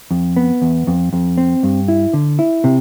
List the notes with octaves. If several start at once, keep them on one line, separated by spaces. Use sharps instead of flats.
F2
B3
E2
F2
F2
C4
G2
E4
D3
E4
C3